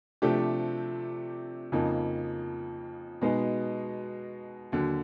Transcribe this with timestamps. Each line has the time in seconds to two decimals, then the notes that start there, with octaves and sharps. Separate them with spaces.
0.22 C3 F3 A3 D4 G4
1.72 F2 C#3 F3 A#3 D#4
3.22 B2 G#3 B3 D#4
4.72 D#2 D3 F#3